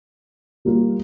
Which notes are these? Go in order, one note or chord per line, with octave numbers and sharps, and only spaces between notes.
G3 A#3 F4